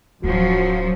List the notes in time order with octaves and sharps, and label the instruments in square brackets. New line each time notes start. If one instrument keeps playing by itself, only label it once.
[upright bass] D1 [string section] F#2 F3 F#3 [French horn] F#4